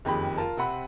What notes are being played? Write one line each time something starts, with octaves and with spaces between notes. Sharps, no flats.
F#1 F2 D#3 G4 G#4 B5
F4 A#4 A5
C3 C4 F#5 B5